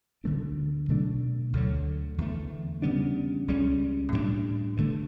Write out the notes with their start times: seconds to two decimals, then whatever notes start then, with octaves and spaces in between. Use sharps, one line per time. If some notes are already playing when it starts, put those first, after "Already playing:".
0.24 D2 D3 A3 D4
0.89 B2 F#3 A3 D4
1.53 D2 D3 F#3
2.18 E2 D3 A3
2.82 C#3 G3 B3 D4
3.48 C#2 C#3 G3 C#4
4.12 A2 G3 B3 D4
4.77 G2 D3 A3